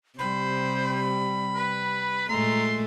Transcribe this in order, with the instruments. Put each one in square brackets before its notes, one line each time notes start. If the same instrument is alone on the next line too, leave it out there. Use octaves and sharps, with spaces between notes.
[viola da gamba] C3 [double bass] G3 [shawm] C5 [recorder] B5
[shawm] B4
[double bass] A#2 [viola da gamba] G#3 A3 [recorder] A#5 [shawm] C6